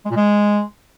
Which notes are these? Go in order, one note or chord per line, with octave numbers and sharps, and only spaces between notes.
G#3
A#2
G#3